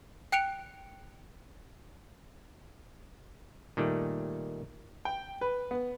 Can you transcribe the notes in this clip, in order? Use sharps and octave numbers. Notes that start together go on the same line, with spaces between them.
G5 F#6 C#7 D7 F7
A#2 D#3 G3 A3
G5
B4
B3